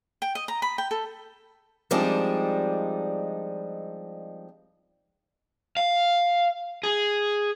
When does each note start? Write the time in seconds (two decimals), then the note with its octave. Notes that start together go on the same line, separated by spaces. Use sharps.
0.22 G5
0.35 D#5
0.48 A#5
0.62 B5
0.78 G5
0.91 A4
1.91 F3 G3 G#3 C4 D4 D#4
5.77 F5
6.83 G#4